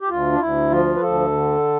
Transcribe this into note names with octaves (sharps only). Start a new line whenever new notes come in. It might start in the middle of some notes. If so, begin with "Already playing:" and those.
G4
D2 F4
D4
D2 E4
F3 F4
B4
D2 A4
D3